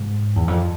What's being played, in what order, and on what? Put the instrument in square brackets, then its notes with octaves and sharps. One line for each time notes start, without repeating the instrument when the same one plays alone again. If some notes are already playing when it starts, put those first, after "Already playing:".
Already playing: [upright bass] G#2
E2
F2